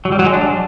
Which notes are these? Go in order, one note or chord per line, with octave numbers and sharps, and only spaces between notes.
F#3
G3
F#3
G#3
D4